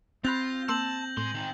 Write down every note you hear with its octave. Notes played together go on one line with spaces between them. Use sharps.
C4 F4 B5 F#6 G6 A6 A#6
A#3 A5 C6 E6 G6 F#7
A2 G#3 C6
D#3 C4